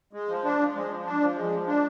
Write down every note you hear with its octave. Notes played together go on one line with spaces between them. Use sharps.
G#3
F3
D4
F3
G#3
F3
D4
F3
G#3
F3
D4